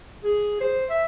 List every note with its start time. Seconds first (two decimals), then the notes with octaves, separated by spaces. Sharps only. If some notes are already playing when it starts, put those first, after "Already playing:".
0.24 G#4
0.61 C5
0.90 E5